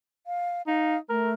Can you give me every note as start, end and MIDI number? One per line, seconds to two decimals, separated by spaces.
0.27 0.62 77
0.67 0.97 63
0.67 0.97 77
1.09 1.34 57
1.09 1.32 70